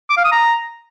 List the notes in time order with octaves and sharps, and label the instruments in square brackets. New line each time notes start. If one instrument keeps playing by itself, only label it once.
[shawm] D6
F5
D#6
A#5